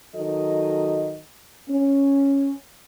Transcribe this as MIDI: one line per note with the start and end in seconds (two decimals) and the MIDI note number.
0.16 1.18 51
0.16 1.18 54
0.16 1.18 69
0.16 1.18 75
1.70 2.52 61